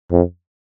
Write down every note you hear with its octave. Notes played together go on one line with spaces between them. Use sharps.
F2